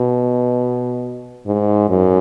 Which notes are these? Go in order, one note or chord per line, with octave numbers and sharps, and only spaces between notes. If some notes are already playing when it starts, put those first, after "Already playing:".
Already playing: B2
G#2
F#2